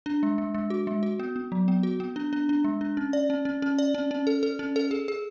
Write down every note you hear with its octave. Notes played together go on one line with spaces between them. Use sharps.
D4
G#3
G#3
G#3
F#4
G#3
F#4
B3
B3
F#3
B3
F#4
B3
D4
D4
D4
G#3
D4
C#4
D5
C#4
C#4
C#4
D5
C#4
C#4
A4
A4
C#4
A4
G#4
G#4